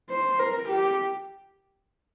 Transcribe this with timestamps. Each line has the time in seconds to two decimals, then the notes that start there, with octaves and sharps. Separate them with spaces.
0.10 C5
0.39 A#4
0.69 G4